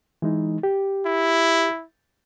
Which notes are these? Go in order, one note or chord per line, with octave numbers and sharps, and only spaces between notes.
E3 G#3 D#4
G4
E4